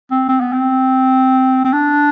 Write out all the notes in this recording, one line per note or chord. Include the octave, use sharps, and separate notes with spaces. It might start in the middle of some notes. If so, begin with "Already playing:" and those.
C4
C4
B3
C4
C4
D4